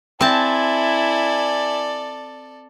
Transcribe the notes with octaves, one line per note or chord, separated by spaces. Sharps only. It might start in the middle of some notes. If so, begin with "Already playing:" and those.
C4 E4 A4 D5 G#5 A5